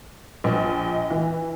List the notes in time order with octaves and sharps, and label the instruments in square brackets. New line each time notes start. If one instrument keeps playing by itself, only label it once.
[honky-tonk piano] A#1 [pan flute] D#5
[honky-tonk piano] E3